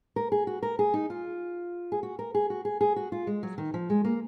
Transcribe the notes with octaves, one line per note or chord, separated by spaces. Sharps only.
A#4
G#4
F#4
A#4
G#4
D#4
F4
G#4
F#4
A#4
G#4
F#4
G#4
G#4
F#4
F4
G#3
F#3
D#3
F3
G#3
A#3